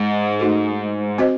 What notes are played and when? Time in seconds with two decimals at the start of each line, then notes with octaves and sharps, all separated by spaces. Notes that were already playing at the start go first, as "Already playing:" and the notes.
Already playing: G#2
0.39 A3 D#4 F#4 A4
1.18 C4 F#4 C5 D#5